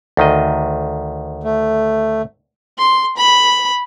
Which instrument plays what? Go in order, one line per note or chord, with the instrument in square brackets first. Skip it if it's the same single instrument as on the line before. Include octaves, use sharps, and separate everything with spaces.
[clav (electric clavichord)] D2 D#3 D#5
[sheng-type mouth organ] A3
[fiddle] C6
B5